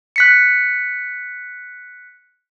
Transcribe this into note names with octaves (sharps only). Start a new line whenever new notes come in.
F#6 B6 C#7